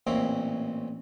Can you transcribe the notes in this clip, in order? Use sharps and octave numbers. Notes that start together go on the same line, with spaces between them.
A1 A#2 C4 E4 C#5 D6